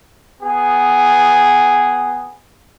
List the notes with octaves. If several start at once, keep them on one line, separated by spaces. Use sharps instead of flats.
B3 G#4